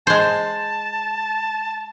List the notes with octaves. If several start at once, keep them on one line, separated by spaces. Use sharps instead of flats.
G#3 C5 A5